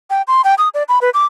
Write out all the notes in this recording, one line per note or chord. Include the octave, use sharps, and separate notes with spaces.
G5
C6
G5
D#6
D5
B5
B4
D6